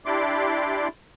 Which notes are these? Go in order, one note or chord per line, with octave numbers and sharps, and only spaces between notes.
D4 E4 G4 D5 C6 D6